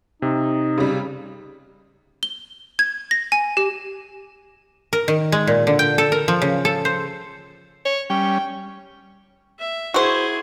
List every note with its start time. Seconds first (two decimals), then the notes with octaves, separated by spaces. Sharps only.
0.22 C3 D#4
0.78 C#3 G3
2.23 G7
2.79 G#6
3.11 A#6
3.32 G#5
3.57 G4
4.93 A#4
5.08 D#3
5.32 G#3
5.47 A#2
5.67 D3
5.79 G5
5.98 A4
6.12 A#4
6.28 F3
6.42 C#3
6.65 A4
6.85 C5
7.86 C#5
8.10 G3 C#4 G5
9.59 E5
9.94 E4 F#4 G#4 C5